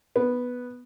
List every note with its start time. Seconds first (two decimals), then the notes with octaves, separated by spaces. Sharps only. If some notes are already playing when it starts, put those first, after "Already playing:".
0.16 B3